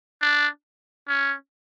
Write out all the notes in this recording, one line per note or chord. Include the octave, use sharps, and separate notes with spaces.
D4
C#4